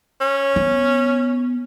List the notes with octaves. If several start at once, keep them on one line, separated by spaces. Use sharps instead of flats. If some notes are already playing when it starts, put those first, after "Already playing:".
C#4
B3